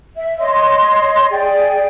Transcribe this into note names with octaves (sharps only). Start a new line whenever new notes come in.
E5
C#5 D#5 C6
G#4 D5 G5